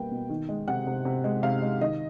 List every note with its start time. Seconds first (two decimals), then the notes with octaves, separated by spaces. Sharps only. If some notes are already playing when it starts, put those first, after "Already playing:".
Already playing: B2 G3 A#3 B4 G5
0.11 B2
0.30 D#3
0.49 G#3
0.68 C3 F#5
0.87 C3
1.05 C3
1.24 G#3
1.43 C3 F5
1.62 G#3
1.81 D#3 D#5